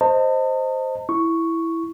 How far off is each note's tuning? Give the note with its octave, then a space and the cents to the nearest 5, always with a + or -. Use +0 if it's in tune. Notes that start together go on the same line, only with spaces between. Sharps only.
C5 +0 D#5 +0 A5 +40
E4 +0 C#6 +0